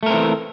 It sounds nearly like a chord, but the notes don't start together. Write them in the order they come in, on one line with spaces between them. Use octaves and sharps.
A3 A#4 C4 E3